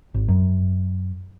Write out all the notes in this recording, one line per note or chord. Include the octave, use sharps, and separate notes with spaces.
G#1
F#2